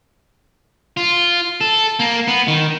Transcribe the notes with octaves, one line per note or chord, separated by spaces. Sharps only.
F4
A4
A#3
B3
D#3